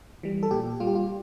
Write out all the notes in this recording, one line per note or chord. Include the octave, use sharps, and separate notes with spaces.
E3 G3
A4
A#2 G4
G3 F4
G4
F4